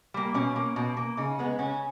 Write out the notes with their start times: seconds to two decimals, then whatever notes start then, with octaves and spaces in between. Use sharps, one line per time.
0.14 G3 A#3
0.34 B2 C#4
0.56 A#3
0.76 B2
0.97 A#3
1.17 C#3 D#4
1.39 G#3 B3
1.59 C#3 C#4